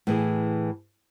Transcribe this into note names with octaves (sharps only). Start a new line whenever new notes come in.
A2 E3 G#4